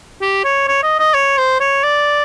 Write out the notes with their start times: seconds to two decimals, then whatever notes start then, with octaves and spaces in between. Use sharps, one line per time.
0.21 G4
0.44 C#5
0.68 C#5
0.83 D#5
0.99 D#5
1.14 C#5
1.38 C5
1.60 C#5
1.84 D5